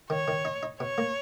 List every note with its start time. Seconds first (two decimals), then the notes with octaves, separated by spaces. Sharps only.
0.10 D#3 C#5
0.28 D#3
0.45 D#4
0.63 D#4
0.80 B2 C#5
0.98 A#3